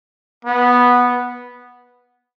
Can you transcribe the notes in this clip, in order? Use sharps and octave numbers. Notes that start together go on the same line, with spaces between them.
B3